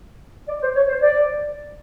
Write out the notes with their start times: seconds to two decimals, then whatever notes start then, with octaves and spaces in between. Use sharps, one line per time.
0.48 D5
0.61 C5
0.75 C#5
0.88 C5
1.01 D5